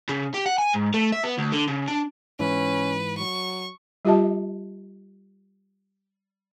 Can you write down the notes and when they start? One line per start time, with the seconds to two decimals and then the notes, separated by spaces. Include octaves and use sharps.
0.09 C#3
0.34 G4
0.46 F#5
0.58 G#5
0.73 G#2
0.94 A3
1.13 E5
1.24 B3
1.38 D2
1.53 D3
1.68 C#3
1.88 D4
2.40 G#2 E3 C#4 B4
3.18 F#3 C#6
4.05 G3 F4 G4 D#5 E5 A5